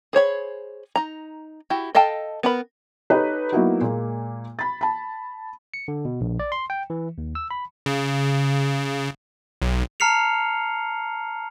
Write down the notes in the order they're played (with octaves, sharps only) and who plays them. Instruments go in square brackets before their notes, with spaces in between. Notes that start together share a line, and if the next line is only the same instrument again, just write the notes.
[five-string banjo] G#4 C5 C#5 B5
D#4 A#5
E4 F#4 G4
A4 D#5 F5 G5 A5
B3 A#4 B5
[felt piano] D#4 G4 A4 B4 C#5
F#3 A#3 B3 D#4 E4 F#4
A#2 G#3 A#3
B5 A6
A5 B5
[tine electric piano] C#7
D3
B2
A#1
D5
C6
G5
E3
D#2
E6
B5
[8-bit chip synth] C#3
B1
[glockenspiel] A5 A#5 F6 C7 C#7 F7